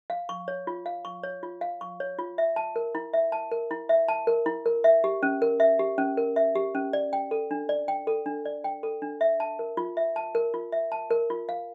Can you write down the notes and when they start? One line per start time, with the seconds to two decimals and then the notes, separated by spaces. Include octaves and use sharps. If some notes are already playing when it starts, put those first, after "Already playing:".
0.10 F5
0.29 C#6
0.48 C#5
0.67 F4
0.86 F5
1.05 C#6
1.23 C#5
1.43 F4
1.61 F5
1.81 C#6
2.00 C#5
2.19 F4
2.38 E5
2.56 A5
2.76 A#4
2.95 E4
3.13 E5
3.32 A5
3.51 A#4
3.71 E4
3.89 E5
4.08 A5
4.27 A#4
4.46 E4
4.66 A#4
4.84 E5
5.04 G4
5.23 C#4
5.42 A#4
5.60 E5
5.79 G4
5.98 C#4
6.17 A#4
6.36 E5
6.55 G4
6.75 C#4
6.93 D5
7.13 G5
7.31 A4
7.51 D4
7.69 D5
7.88 G5
8.07 A4
8.26 D4
8.45 D5
8.64 G5
8.83 A4
9.02 D4
9.21 E5
9.40 A5
9.59 A#4
9.77 F4
9.97 E5
10.16 A5
10.35 A#4
10.54 F4
10.72 E5
10.92 A5
11.11 A#4
11.30 F4
11.49 F5